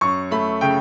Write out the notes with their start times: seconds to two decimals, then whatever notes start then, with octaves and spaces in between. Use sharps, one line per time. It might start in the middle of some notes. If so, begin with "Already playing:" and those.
0.01 F#2 C#6
0.31 A3 B5
0.61 C#3 G5